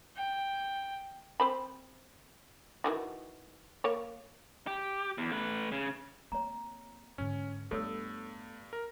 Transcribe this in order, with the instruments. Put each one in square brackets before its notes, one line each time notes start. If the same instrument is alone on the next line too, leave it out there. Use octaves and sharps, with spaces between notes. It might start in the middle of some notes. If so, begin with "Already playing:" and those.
[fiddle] G5
[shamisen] C4 C5 B5
D#3 E3 F#4
A#3 C#5
[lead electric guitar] G4
E2
A3 B4
C#3
[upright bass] A#3 C4 [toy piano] C#5 A#5
[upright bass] G#2 D3 [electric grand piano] C#4
[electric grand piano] G2 [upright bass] A3 B3 [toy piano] A4 C#5 E6
[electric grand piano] A#4